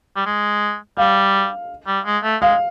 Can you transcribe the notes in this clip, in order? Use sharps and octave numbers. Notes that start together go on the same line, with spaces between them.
G3
G#3
G3 F5
G3
G#3
A3
G#3 F5